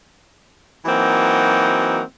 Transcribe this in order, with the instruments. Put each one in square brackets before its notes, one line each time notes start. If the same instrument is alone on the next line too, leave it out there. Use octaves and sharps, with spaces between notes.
[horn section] E3 F#3 A#3 C4 D#4 F#4